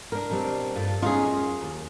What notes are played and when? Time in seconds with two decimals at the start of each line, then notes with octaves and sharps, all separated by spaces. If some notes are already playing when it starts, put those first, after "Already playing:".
0.12 D4 A#4
0.30 B2 G3 C4
0.75 G2 F4 A4
1.02 B3 C#4 D#4 F4 G#4
1.25 F#2
1.61 D#2